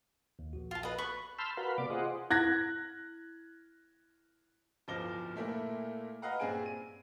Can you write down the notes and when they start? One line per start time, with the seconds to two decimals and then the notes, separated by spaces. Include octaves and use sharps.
0.39 D#2
0.53 A#1 F#4
0.71 F4 A5
0.83 B4 D#5
0.98 B4 B5 C#6
1.38 A5 B5 C6 E6 F6 G6
1.57 F#4 A#4 B4 F5 B5
1.78 C3 A#3 D5 D6
1.90 F4 G#4 C5 D#5 F#5
2.30 E4 F#6 G#6 A#6
4.88 D1 G1 F3 D6 A#6 G7
5.35 A#2 A3 A#3 E4
6.22 B4 D#5 F5 F#5 A#5
6.40 G2 A#2 C4 G#4 G#5 D7
6.66 D#7